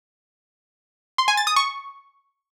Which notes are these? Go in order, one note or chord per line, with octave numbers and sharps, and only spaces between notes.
C6
G#5
A6
D#6
C#6